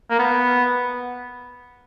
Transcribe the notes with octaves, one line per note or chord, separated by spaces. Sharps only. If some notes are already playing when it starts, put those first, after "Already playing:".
A#3
B3